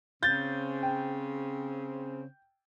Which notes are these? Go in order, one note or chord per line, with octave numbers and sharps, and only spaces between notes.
C#3 C4 G6 A6
G5